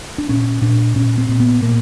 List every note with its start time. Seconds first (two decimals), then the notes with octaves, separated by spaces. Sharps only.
0.18 D4
0.29 A#2 C#4
0.62 A#2 D4
0.96 A#2 C#4
1.18 C4
1.29 A#2
1.40 B3
1.62 A#2 A#3